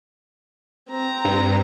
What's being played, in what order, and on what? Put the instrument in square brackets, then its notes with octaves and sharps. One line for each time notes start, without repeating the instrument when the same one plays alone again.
[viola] C4 A#5
[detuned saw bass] G2